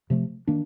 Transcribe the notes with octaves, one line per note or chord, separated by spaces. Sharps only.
C3 F3 A3
D#3 A#3 D4